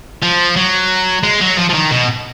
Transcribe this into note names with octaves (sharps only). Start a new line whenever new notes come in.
F3
F#3
G#3
F#3
F3
F3
D#3
B2